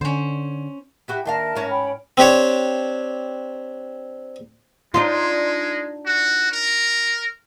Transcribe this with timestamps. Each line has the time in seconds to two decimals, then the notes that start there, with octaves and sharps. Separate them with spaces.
0.01 D3 C#4 C5
1.08 E4 F#4 G4
1.25 D#2 D4 A#4 E5 F5 A5
1.55 G#2 C#4
1.69 G5 B5
2.17 C4 D4 G4 C#5
4.94 G#3 D4 D#4 F4
6.06 F#4
6.52 A#4